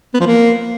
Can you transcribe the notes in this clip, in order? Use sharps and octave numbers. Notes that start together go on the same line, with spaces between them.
B3
F3
A#3